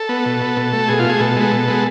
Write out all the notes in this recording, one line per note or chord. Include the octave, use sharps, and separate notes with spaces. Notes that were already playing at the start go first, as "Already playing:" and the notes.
Already playing: A4
B3
B2
B3
B2
A3
B2 G#4
F4
A3 G#4
B2 A4
G#3 B3
B2
G#3 B3